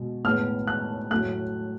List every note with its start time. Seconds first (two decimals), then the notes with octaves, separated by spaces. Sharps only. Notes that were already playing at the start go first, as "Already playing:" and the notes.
Already playing: B2 G#3
0.25 A2 G#3 B3 F6
0.67 F#6
1.11 A2 F#3 A3 F#6